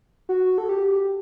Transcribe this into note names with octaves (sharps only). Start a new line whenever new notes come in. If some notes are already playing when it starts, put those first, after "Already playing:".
F#4
A4
G4